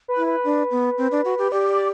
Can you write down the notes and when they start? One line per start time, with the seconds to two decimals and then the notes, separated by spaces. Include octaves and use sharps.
0.08 B4
0.17 E4
0.26 B4
0.44 D4
0.71 B3
0.98 C4
1.11 D4
1.25 F#4
1.38 G4
1.52 G4 D5
1.69 D5